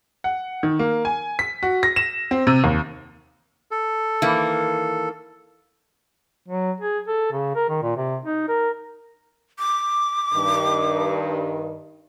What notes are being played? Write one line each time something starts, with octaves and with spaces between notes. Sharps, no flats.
F#5
D#3
A#3
G#5
B6
F#4
A#6
E7
C4
C3
D#2
A4
D#3 E3 A#3
F#3
G#4
A4
C#3
A#4
D#3
A#2
C3
D#4
A#4
D6
G2 D#3